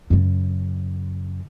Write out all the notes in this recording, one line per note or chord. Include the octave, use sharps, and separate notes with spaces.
F#2 C#3